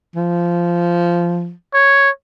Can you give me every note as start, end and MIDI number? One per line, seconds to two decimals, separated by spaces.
0.16 1.52 53
1.74 2.10 73